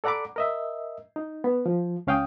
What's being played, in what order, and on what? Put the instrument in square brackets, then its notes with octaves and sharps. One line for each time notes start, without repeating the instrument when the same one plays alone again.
[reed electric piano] A4 D5 F#5 A#5 B5 D6
A#4 D#5 E5
D#4
B3
F3
C#2 C#4 F5 G5 D#6